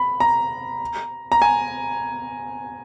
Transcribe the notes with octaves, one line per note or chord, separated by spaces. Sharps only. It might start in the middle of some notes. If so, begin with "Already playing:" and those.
Already playing: B5
A#5
A#5
G#5